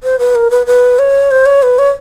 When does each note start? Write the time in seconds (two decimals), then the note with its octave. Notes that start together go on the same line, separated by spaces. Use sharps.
0.03 C5
0.19 B4
0.35 A#4
0.51 B4
0.66 B4
0.99 C#5
1.31 C5
1.46 C#5
1.63 B4
1.79 C#5